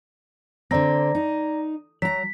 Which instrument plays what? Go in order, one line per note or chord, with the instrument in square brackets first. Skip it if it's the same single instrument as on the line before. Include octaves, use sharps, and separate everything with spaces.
[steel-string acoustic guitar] D3 C4 [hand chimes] D5 A#5 A#6
[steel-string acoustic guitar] D#4
[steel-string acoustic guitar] F#3 A#5 [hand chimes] B6